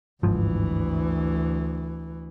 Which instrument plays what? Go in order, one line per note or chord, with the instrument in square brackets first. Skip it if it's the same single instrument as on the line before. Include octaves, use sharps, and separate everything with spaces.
[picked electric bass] G1 G#2 F3 [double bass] D2 E3